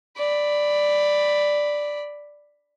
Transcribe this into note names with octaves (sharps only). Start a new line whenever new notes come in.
D5 B5